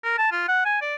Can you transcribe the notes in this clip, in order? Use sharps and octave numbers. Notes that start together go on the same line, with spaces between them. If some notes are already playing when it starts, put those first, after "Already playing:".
A#4
A5
F4
F#5
G#5
D5